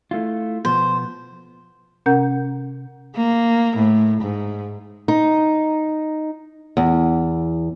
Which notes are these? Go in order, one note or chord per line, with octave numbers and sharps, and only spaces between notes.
A3 E4 F4
B2 F3 B3 C5
C3 C#4 A#4 F#5 G6
A#3
A2
G#2
D#4
E2